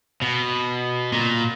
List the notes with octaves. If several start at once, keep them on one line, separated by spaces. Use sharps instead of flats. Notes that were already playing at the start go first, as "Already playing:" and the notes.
B2
A#2